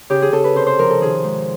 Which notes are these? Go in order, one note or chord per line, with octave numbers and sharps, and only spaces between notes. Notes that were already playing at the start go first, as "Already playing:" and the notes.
C#3 G4
G#4
C#3 A4
B4
C3 C5
C5
F3 A#4
A4
D#3 G#4
G#2